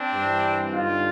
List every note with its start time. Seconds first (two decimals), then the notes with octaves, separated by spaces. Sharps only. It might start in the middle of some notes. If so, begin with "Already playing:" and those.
Already playing: C4 D4
0.13 G2
0.18 E3
0.73 G2 D3 D#4 F4